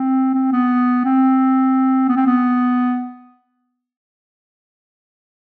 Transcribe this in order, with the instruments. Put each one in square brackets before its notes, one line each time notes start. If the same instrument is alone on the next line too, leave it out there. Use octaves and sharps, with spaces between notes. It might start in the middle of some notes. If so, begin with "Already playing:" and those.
Already playing: [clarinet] C4
C4
B3
C4
B3
C4
B3